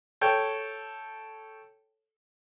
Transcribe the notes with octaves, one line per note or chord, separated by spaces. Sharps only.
A4 C#5 G5